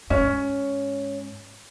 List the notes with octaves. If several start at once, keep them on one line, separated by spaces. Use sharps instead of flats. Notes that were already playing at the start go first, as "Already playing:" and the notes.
G#2 C#4